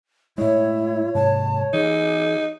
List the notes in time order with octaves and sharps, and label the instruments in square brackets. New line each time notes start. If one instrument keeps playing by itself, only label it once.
[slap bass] A2 G#3 [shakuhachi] E4 [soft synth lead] C#5
[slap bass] G#2 C3 [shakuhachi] A5
[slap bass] E3 [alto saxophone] D#4 [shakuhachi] G#4